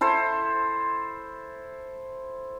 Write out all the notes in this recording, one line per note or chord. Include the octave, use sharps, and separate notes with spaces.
E4 A4 C5